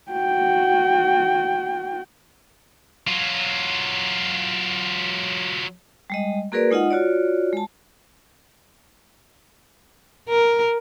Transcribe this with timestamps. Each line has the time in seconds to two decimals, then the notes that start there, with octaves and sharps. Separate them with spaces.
0.11 F#4 G5
3.07 F#3 F4
6.10 G3 G#3 D#5
6.52 A#3 F#4 G#4 A#4 B4 D5
6.70 G#3 D#4 F4 D#5 F#5
6.90 F4 F#4 C#5 D5
7.53 G#3 A5
10.29 A#4